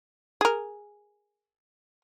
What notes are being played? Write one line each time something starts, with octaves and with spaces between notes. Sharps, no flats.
G#4 A#4